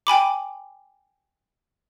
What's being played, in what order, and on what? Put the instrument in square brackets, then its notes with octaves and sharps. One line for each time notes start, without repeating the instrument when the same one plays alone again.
[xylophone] G5 G#5 B5 D6